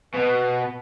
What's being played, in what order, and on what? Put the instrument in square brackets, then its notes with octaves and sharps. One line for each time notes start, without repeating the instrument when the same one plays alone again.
[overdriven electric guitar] B2 [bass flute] B4